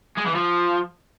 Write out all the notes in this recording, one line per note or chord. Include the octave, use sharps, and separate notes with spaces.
G#3
E3
F3